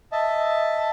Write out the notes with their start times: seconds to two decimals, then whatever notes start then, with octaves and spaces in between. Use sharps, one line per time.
0.12 D#5 E5 A5